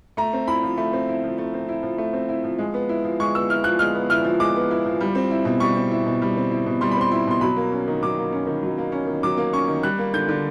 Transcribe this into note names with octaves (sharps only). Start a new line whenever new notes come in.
A3 A#5
C4
E4 B5
F3
A3 B5
C4
E4
F3
A3
C4
E4
F3
A3
C4
E4
F3
G#3
B3
E4
F3
G#3 C#6
B3 E6
E4 F6
F3 F#6
G#3 F6
B3
E4 F6
F3
G#3 D6
B3
E4
F3
G3
C4
E4
B2
G3 C#6
C4
E4
B2
G3
C4
E4
B2
G3 C6
B5
C4 C6
E4
B2 C6
F#3 B5
A#3
C#4
D#3
F#3 D6
A#3
C#4
D#3
F#3
A#3
C#4
D#3
F#3 D6
A#3
C#4 C#6
D#3
G3 F#6
A#3
D3 G6
D3